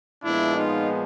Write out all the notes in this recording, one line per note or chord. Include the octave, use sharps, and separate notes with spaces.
A#2 F3 G#3 B3 D4 E4
D#4 F4